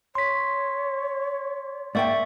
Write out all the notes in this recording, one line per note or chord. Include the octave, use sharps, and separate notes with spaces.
C#5 C6 B6
G#2 A#3 D5 E5 G5 C#6